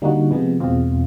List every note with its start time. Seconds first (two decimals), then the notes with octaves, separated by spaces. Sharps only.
0.02 D3 G3 A#3 D#4 F#4
0.31 C3 F3 G#3 B3
0.60 E2 B2 G#3 C4 F4